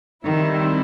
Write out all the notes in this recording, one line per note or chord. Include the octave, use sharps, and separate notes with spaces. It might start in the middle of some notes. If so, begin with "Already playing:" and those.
D#3 G3 C4 E4